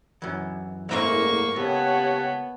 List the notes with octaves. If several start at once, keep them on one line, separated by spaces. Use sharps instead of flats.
F#2 E3
F#1 E2 G#2 A3 A#3 E4 A#4 C#6
C#2 B3 G4 C#5 F#5 G5 A5